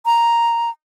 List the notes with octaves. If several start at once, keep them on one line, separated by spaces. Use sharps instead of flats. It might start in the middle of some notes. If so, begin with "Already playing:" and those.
A#5